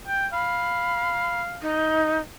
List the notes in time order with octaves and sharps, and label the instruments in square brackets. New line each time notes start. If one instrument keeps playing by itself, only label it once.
[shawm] G5
[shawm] F5 [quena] B5
[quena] D#4